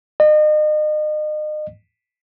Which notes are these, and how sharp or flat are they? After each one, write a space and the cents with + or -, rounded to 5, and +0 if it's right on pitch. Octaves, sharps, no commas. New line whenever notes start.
D#5 -35